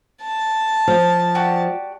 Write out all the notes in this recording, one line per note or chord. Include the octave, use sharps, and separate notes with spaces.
A5
F3
F#4 G4 D5